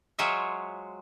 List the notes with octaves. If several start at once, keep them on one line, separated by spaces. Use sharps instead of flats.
F#3 G#3 F4 C5 C#5 E5